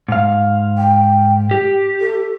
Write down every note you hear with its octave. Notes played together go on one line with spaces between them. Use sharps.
G#2 F5
G5
G4
A4